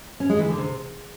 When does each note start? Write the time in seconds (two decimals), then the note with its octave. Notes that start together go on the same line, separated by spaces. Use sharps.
0.20 C#4
0.30 G#3
0.39 E3
0.49 D3
0.58 C3